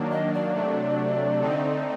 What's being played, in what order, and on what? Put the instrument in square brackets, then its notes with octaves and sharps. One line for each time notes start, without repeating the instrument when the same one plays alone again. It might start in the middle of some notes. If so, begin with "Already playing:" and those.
Already playing: [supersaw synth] D#3 F#3 A#3 D4
[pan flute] D#5
D5
[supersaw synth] C3 F#3 A3 D4
D3 A3 C4 D#4